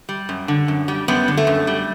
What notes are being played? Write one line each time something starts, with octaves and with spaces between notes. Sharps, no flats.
G3
F#2
D3
F#2
G3
F#2 G3 B3
D3
A3
F#2
G3